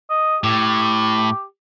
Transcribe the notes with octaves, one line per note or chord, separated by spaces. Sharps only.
D#5
A2 G4